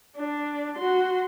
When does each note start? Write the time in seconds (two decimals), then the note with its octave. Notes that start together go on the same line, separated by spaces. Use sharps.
0.16 D4
0.76 F#4 C6